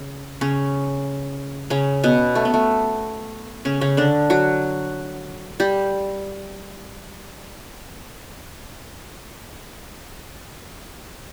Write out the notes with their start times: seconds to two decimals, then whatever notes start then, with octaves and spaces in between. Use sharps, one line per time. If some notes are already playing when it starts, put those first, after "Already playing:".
Already playing: C#3
0.41 C#3 C#4
1.70 C#3 C#4
2.04 B2 B3
2.35 A3
2.45 B3
2.54 A3
3.65 C#3 C#4
3.81 C#3 C#4
3.97 D3 D4
4.30 F#3 F#4
5.60 G3 G4